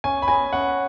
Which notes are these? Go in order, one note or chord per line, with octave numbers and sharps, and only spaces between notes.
C#4 G#5
B5
B4 D#5 G#5
C#4 F#5